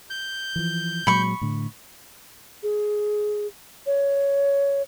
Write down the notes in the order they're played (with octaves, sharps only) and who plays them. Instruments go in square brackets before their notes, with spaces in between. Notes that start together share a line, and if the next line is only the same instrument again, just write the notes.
[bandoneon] G6
[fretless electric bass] E3 F3
[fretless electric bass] A#2 F#3 G#3 [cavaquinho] B5 C#6
[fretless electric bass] A2 D3
[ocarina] G#4
C#5